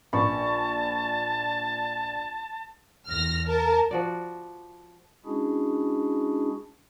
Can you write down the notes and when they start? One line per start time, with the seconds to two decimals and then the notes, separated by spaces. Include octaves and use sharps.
0.13 A#1 A5 B5 C#6
3.09 E2 F6 A#6
3.47 A#4 A5
3.91 F3 F#4 D5
5.26 G#3 C#4 D4 E4 F#4 G#4